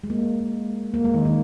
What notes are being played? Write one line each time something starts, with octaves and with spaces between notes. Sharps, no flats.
G#3
A#3
A#3
G#3
D#3
D#3